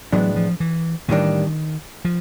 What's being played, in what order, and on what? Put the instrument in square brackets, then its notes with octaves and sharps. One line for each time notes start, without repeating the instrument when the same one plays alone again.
[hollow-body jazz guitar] A2 E3 G#3 B3 D4 [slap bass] F#3
[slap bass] F3
E3
[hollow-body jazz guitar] A2 E3 G3 A#3 D4 [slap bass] D#3
[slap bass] F3